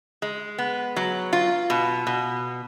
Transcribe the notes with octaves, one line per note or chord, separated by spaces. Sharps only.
G#3
B3
F#3
F4
B2
B2